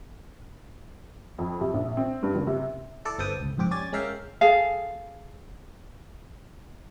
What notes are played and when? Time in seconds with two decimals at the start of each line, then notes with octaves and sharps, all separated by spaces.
1.38 F2
1.61 C3
1.74 A#1
1.97 C4
2.23 G2
2.35 F#1
2.47 C3
3.05 E4 A4 D5
3.18 G1 C4 A4 B4 G5 D#6
3.40 C#2
3.58 F2 G#2 C4 G4 D6
3.71 C#4 G4 D5 G#5 G#6 A6
3.93 G#3 C#4 A#4 E5 F5 G5
4.41 G#4 A4 F5